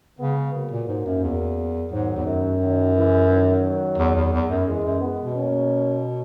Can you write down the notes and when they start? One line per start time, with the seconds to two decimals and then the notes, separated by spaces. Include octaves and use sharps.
0.19 C#3 G#3 B3
0.54 F#3 A#3
0.71 A#2
0.88 G#2
1.06 F#2
1.23 E2
1.91 G#2 D#3 F#3
2.16 E2
2.26 F#2
2.60 D#3 F#3
2.95 C#3 E3
3.29 D#3 F#3
3.98 E2
4.15 E2
4.32 E2
4.50 F#2
4.67 E3 G#3
4.84 F#2
5.01 G#3 B3
5.19 B2
5.36 A#3 C#4